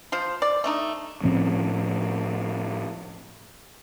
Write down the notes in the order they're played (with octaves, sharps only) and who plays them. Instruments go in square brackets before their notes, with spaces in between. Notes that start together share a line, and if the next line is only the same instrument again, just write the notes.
[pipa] F3 C5
D5
A3 D4 D#4
[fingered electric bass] A2 F3 C4 C#4